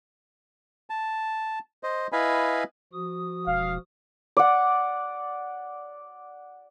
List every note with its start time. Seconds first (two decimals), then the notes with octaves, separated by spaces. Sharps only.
0.90 A5
1.83 C5 D#5
2.12 E4 B4 D#5 F5 G#5 B5
2.93 F3 F#4 D#6
3.47 E1 F5
4.37 D5 F#5